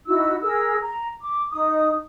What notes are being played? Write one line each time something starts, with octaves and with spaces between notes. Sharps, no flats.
D#4 E4 F#4 E6
G#4 A#4 E6
A#5
D6
D#4 D#6